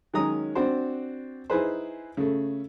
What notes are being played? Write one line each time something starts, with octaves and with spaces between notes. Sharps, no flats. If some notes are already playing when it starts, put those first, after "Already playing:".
D#3 F#3 G#3 C#4 A#5 D#6
C4 D4 F#4 C5
D#4 E4 G#4 B4 C5
C#3 A3